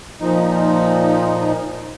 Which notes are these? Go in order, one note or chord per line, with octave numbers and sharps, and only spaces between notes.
A#2 F3 D#4